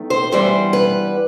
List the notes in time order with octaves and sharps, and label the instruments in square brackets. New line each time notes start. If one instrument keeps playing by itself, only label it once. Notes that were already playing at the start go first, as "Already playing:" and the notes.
Already playing: [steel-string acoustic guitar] E2 D#3 A3
C5
G2 E3 G3 B3 C5
B4